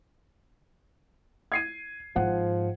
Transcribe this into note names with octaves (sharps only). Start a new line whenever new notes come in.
G#6 C7 D#7
G#1 G#2 F3 F#5